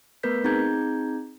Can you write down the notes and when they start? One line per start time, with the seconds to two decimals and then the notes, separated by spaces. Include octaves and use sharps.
0.23 A3 B3 A#4 B4 G6 B6
0.44 C4 D#4 G#4 A#5 G6 G#6